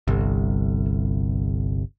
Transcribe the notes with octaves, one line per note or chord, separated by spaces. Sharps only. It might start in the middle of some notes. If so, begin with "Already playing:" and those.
G1 C2